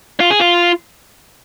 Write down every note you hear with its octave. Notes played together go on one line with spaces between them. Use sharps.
F4
G#4
F4